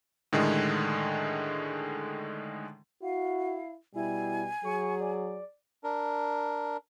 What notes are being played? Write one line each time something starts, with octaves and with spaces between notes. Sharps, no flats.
A2 D3 D#3 G#3
E4 F#4 F5
B2 G3 E4 G#5
F#3 G#4 C#6
D5
D4 A#4